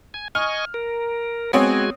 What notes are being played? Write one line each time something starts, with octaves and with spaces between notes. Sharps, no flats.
G#5
D#5 G#5 C#6 F6
A#4
G#3 B3 C4 F#4 C#5 G#5